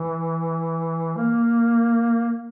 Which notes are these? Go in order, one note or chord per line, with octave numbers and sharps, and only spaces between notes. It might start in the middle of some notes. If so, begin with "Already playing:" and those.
Already playing: E3
A#3